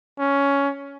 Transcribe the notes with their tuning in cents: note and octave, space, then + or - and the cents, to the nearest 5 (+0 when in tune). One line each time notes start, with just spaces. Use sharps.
C#4 +10